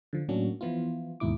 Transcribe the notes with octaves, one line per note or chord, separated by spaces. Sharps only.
D3 F3
A2 F#3 A#3 C#4 D4 F#4
E3 F3 B3 E4 F4
D#2 G#2 B2 E4 D6